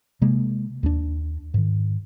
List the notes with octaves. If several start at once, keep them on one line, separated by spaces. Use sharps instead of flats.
C3 G#3 A#3
D#2 A#3 D4
G#2 D#3